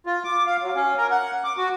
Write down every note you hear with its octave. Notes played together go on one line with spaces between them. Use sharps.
F4
D6
F5
F#3
C#4
A#4
F#5
D6
F#4